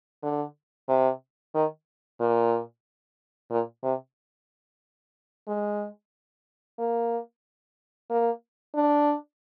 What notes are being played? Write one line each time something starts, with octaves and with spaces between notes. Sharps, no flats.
D3
C3
D#3
A#2
A#2
C3
G#3
A#3
A#3
D4